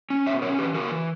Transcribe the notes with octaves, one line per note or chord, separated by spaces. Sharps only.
C#4
B2 C#5 E5
C#4 A#4 C#5
E3 G4 B4
C#3 F#4 A#4
E3